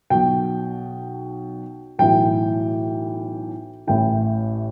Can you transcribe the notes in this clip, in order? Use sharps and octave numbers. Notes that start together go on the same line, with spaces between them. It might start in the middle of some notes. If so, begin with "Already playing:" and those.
B1 B2 G5
B1 A2 E3 G5
A1 A2 E3 G5